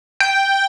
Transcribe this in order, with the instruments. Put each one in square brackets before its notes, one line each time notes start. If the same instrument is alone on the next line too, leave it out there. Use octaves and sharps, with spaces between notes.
[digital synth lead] G5